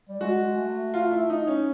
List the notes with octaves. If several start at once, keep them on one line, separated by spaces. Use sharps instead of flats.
G3
G#3 F#4
A3
F4
E4
D#4
C#4